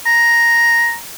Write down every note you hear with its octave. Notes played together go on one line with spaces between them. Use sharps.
A#5